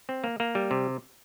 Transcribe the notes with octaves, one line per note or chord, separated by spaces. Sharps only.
C4
A#3
A#3
G3
C3